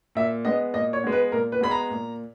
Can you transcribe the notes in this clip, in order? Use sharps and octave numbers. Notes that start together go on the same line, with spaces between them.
A#2 E5
G#3 B3 D#5
A#2 D#5
C#5
G#3 B3
B4
A#2 A#4
B4
G#3 B3 B5
A#5
A#2